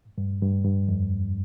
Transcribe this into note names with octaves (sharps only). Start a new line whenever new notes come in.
G2
G2
G2
F2